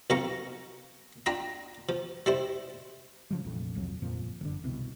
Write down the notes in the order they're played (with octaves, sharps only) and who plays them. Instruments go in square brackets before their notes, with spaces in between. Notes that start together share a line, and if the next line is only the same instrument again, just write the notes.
[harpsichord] B1 F3 C4 F5 A#5 C#6
D4 F4 G5 A#5 B5
F3
G3 E4 C5
[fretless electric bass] C#3 F3 G3
F1 A#1 F2
D#1 C2 F2 F#3
G1 F2 A#2 F3
F#1 D3
C2 B2